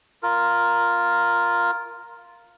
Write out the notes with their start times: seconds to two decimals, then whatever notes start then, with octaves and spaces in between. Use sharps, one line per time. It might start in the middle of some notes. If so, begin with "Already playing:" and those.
0.23 F4 A#4